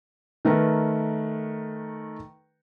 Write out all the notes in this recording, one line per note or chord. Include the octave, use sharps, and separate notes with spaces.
D#3 A3 A#4 B4